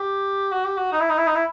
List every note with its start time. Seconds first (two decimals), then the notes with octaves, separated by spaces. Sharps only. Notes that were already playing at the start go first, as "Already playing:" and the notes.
Already playing: G4
0.52 F#4
0.64 G4
0.77 F#4
0.92 D#4
1.00 E4
1.09 D#4
1.18 E4
1.27 D#4
1.35 E4